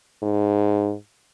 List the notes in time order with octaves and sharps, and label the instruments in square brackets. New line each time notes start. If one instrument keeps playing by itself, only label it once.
[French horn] G#2